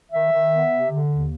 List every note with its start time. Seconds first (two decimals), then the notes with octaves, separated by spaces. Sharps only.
0.11 D#3 E5
0.30 D#3
0.50 B3
0.70 C3
0.90 D3
1.09 D#2